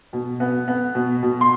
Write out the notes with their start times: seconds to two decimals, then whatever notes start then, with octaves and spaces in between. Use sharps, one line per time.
0.13 B2
0.40 B3
0.68 B3
0.95 B2
1.23 B2
1.41 C6